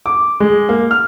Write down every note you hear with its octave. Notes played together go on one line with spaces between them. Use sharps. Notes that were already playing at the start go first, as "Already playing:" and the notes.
D6
G#3
A#3
F6